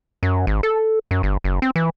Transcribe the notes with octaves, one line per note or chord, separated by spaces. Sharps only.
F#2
G#1
A4
F#2
G1
F#1
C4
E3